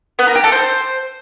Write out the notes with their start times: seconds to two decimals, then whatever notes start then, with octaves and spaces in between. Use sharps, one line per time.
0.19 B3
0.27 A#4
0.35 G4
0.44 A4
0.52 C5